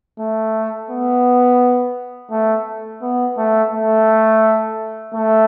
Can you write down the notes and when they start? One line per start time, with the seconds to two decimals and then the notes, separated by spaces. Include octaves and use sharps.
0.20 A3
0.90 B3
2.31 A3
3.02 B3
3.37 A3
3.73 A3
5.14 A3